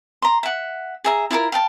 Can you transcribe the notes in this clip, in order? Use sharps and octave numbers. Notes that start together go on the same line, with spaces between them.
A#5 C6
E5 F#5
G#4 E5 A#5
E4 F4 A4 A#4
F5 G5 A5